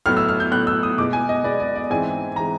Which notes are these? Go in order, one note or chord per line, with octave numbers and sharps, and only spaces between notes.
A2 F#3 B3 F6
E6
F6
G6
A2 F#3 B3 F#6
E6
D#6
B2 G#3 B3 D6
G#5
D#5
B2 G#3 B3 D5
D5
D5
G#2 E3 G#3 C4 G#5
E3 G#3 C4 A#5